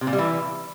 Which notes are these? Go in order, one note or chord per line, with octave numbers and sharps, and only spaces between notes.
C3
A#2
G3
E3